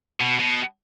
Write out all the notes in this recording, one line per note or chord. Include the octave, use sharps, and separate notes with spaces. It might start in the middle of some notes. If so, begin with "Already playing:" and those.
B2
B2